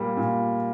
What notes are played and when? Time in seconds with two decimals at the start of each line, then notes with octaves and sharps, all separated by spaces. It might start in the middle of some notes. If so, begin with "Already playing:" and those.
Already playing: A#2 G3 A#3
0.17 A#2